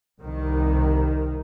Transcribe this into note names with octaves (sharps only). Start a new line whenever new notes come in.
C2 D#3